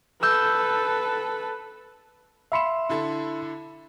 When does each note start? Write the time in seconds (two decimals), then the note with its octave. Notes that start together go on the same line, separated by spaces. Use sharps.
0.23 A4 B4 E6 G6
2.52 E5 F5 B5 C6 C#7 E7
2.89 D3 E4 A4